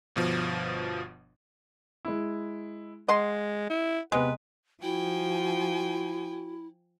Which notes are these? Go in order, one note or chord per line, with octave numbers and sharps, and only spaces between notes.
G1 B2 F3
G#3 E4
G#3 D#5 F#5 C6
E4
C3 G#3 B3 B4
F3 E4 F#4 G5 G#5